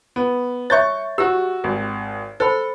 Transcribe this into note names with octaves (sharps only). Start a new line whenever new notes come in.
B3
C#5 E5 C#6 G6 A6
F#4 G4 E6
G#1
A4 C5 B5